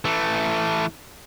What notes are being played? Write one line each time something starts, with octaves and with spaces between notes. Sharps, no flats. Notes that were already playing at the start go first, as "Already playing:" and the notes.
E3 A3